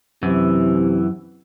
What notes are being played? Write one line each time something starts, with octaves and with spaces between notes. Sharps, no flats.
F#2 C3 E3 E4